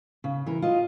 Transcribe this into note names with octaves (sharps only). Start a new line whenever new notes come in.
C#3
E3 A#4
F4 D#5